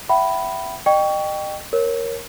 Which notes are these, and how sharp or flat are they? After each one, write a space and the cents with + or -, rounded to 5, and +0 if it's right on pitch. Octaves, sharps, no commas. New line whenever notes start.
E5 +20 G5 -45 B5 +0
D#5 -35 G5 +0 C#6 +20
A#4 +0 C#5 -20